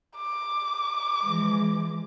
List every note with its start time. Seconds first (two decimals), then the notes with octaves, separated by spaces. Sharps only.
0.17 D6
1.22 E3 F3 G#3